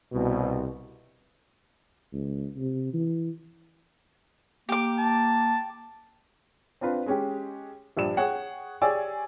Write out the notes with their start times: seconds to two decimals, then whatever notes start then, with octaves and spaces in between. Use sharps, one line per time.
0.12 C2 B2
2.13 C#2
2.57 C3
2.93 E3
4.69 A#3 G4 D6
4.98 A5
6.81 C4 D4 F4 B4
7.06 G#3 C#4 G4
7.97 A#1 G2 D5 E7
8.17 G#4 C#5 F#5 G5
8.82 G4 G#4 C#5 D5 G#5 E6